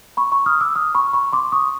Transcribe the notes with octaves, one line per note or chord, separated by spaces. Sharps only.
B5 C#6
B5 C#6
D#6 F6
D6 E6
D#6 F6
B5 C#6
B5 C#6
C6 D6
C#6 D#6